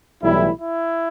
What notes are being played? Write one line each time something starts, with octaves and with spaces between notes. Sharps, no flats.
B1 A2 E3 G3 E4
E4